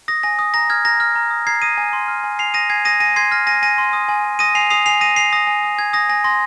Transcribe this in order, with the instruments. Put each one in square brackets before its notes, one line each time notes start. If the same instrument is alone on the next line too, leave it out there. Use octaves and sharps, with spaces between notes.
[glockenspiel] D#6 A#6
G#5 A#6
D#6
A#5 A#6
F6 G#6
A#5 A#6
F6
A#5
D#6
A#5 G#6 C7
D#6 A#6 D#7
G#5
C6
F6
G#5
G#5 C7 F7
D#6 A#6 D#7
G#5 G#6 C7
D#6 A#6 D#7
G#5 A#6 D#7
C6 G#6 C7
F6 A#6
G#5 A#6 D#7
G#5 A#6 D#7
C6
D#6
G#5
G#5
D#6 A#6 D#7
G#5 C7 F7
D#6 C7 F7
G#5 C7 F7
D#6 A#6 D#7
G#5 C7 F7
D#6 A#6
G#5
D#6
G#5 G#6
D#6 A#6
G#5 A#6
C6 A#6